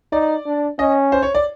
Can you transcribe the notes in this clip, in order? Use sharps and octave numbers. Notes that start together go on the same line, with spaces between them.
D#4 D5
D4
C#4 D#5
C5
C#5
D5